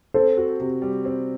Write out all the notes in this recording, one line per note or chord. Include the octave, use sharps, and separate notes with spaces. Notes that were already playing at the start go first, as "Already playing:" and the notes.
C4 A4 C5
F#4
C3
G3
C4